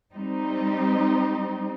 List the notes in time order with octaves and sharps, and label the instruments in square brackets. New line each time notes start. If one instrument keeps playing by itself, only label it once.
[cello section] G3 C4 D#4